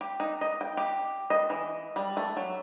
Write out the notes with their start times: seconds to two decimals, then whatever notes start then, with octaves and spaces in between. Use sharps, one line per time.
0.01 G4
0.20 D#4
0.41 D#5
0.61 G5
0.77 G4
1.30 D#5
1.50 E3
1.96 G3
2.17 A3
2.37 F#3